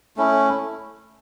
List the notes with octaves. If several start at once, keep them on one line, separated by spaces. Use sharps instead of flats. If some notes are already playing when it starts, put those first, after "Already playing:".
A3 C#4 E4